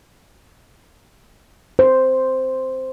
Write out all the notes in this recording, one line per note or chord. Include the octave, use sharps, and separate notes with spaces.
C5